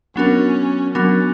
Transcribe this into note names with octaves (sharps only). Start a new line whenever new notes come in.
F#3 B3 C#4 D4 F#4 A#4
F#3 B3 C#4 D4 F#4 A#4